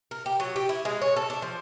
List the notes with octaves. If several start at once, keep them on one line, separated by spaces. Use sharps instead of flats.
A#4
G4
F#3
G4
E4
G#3
C#5
A4
D4
F3